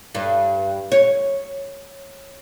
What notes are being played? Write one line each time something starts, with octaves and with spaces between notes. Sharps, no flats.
G2
C#5